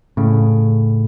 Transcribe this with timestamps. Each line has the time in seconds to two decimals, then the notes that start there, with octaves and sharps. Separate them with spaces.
0.17 A2 C#3